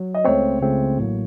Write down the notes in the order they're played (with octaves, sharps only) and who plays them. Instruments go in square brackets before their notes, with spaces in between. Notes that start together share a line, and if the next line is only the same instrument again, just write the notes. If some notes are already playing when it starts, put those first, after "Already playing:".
Already playing: [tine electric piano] F#3
[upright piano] D#5
[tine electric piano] C#2 C#3 A3 C4 [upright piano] C#5
[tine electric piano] C#2 C#3 A3 C4
A1 A2 F#3 A#3